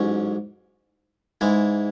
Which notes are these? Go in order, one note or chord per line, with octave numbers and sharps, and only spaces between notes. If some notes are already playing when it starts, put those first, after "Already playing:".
Already playing: A1 G#2 F#3 C#4
G#2 E3 G#3 E4